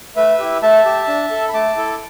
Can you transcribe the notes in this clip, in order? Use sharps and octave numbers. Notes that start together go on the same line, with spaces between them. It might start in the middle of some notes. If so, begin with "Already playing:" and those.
A3 B4 E5
E4 G4
A3 E5 A5
G4
D4
A4
B5
A3 A5 D6
E4 A4